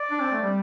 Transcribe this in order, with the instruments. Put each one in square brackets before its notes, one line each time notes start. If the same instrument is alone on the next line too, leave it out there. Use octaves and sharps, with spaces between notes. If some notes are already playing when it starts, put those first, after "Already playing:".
Already playing: [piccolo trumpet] D5
[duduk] D4
C4
A3
G3